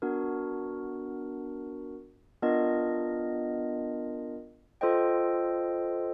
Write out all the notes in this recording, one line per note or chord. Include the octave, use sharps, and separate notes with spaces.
B3 D4 F#4 A#4
B3 D4 F4 A#4 D#5
F4 A4 C5 D#5 G5